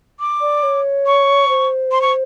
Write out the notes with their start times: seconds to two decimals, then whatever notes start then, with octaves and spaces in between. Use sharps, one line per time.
0.20 D6
0.41 D5
0.63 C#5
1.06 C#6
1.48 C5
1.92 C6
2.02 C#6